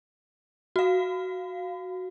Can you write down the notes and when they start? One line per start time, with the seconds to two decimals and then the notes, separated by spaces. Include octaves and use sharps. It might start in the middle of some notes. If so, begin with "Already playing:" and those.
0.76 F#4 F5